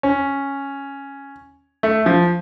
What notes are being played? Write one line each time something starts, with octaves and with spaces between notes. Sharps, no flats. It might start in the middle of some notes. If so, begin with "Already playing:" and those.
C#4
A3
F3